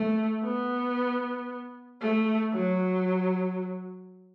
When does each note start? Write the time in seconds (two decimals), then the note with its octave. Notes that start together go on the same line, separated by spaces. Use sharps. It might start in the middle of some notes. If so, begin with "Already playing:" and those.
Already playing: A3
0.44 B3
2.01 A3
2.53 F#3